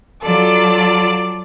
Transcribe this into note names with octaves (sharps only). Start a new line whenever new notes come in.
F#3 F4 A4 D5